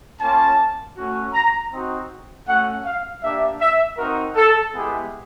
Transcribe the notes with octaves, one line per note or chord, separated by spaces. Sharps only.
A#3 C#4 F4 A5
A3 C#4 F#4
A#5
C4 D#4 F#4
A3 C#4 F#4 F#5
F5
A#3 D4 G4 E5
E5
C4 D#4 F#4 A#4
A4
G#3 B3 E4 G4 G#4